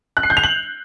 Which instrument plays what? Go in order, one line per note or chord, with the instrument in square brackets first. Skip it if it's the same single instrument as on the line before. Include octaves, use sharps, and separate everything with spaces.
[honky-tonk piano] F#6
C7
G6
F7
F#7